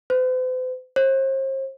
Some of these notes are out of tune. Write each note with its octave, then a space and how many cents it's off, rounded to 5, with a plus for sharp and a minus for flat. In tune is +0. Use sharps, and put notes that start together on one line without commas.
C5 -45
C5 +40